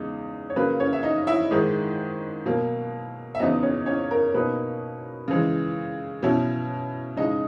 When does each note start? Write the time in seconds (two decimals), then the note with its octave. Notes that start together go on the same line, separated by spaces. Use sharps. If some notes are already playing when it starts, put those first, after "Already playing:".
Already playing: E2 C#3 G#3 D#4
0.50 C#5
0.56 C#3 F#3 A#3 B4
0.80 C#4 C#5
0.93 E5
1.03 D#4 D#5
1.27 E4 E5
1.51 G#2 D#3 G#3
2.46 B2 F#3 A#3
3.35 E5
3.39 E2 C#3 F#3 B3 D#4 D#5
3.63 C#4 C#5
3.86 C#4 C#5
4.11 A#4
4.34 B2 A#3 D#4 B4
5.28 C#3 E3 G#3
6.23 B2 F#3 C#4 E4
7.17 C#3 G#3 D#4 D#5